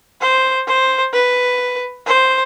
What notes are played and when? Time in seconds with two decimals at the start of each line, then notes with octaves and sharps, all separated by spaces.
0.21 C5
0.67 C5
1.13 B4
2.07 C5